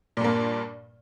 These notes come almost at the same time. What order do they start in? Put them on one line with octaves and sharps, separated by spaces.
A#2 G2 A#3